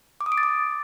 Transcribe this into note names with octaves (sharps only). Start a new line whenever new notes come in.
D6
D#6
D7
A6
D6